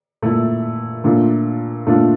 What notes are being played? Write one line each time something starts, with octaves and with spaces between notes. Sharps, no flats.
A#2 A3 E4
A#2 A3 D4 F4
A#2 A3 D4 F4